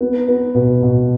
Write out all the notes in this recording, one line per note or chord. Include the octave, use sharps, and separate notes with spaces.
B3
B3
B2
B2